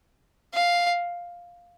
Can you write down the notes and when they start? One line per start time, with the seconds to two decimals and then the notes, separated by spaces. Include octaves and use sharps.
0.54 F5